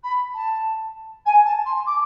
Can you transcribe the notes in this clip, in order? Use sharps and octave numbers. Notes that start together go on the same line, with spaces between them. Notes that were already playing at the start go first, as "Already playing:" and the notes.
B5
A5
G#5
A5
C6
D6